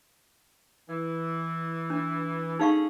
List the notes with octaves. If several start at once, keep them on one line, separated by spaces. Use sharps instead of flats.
E3
D4
A3 C#4 D#4 G#4 F5 C#6